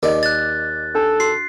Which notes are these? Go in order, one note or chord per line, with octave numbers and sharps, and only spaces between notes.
D#2 A#4 D5 D#5
F#6 A6
D4 A4
F#4 C7